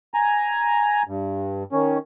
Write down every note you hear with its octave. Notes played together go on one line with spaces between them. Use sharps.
G#5 A#5
G2
D#3 C#4